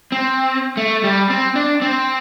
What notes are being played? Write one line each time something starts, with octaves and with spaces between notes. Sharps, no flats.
C4
A3
G3
C4
D4
C4